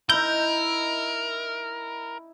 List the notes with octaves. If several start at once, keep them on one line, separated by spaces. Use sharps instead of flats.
D#4 E4 A#4 G6